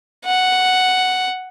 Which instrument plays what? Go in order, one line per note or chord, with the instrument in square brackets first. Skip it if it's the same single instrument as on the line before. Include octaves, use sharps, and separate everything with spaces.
[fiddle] F#5